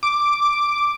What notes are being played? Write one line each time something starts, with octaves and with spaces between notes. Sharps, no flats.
D6